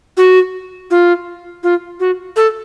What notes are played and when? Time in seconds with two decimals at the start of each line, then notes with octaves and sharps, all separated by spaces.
0.17 F#4
0.91 F4
1.63 F4
2.00 F#4
2.36 A4